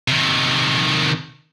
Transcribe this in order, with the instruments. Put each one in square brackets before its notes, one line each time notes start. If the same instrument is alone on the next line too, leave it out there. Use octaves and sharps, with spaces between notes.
[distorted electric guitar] C3 D#3